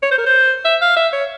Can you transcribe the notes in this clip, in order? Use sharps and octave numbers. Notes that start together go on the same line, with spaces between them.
C#5
C5
A#4
C5
E5
F5
E5
C#5